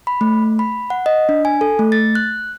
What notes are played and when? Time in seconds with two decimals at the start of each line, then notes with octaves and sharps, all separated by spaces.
0.07 B5
0.21 A3
0.59 B5
0.90 F#5
1.06 D#5
1.29 D4
1.45 G#5
1.61 A4
1.79 A3
1.92 A6
2.15 F#6